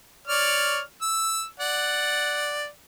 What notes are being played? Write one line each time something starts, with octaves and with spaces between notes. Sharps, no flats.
C#5 D5 F6
E6
D5 F#5